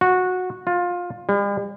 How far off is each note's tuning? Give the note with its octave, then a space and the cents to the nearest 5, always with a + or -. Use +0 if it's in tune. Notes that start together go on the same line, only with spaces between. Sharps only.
F#4 -15
F4 +20
G3 +45